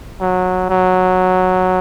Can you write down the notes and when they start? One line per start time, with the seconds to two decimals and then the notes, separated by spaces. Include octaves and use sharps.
0.20 F#3
0.70 F#3